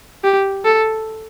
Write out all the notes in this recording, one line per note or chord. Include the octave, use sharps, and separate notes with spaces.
G4
A4